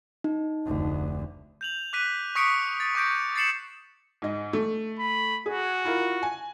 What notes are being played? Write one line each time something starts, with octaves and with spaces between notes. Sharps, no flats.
D#4
F1 D2
G6 F7 F#7
D6 F#6 B6 D#7
C#6 D#6 B6 C#7 D7
A6
C#6 D6 G6 A#6 D7
A6 C7 C#7 E7 F#7
G#2 D#5
A3
B5
F#4 G#4
E4 F4 A#4
G#5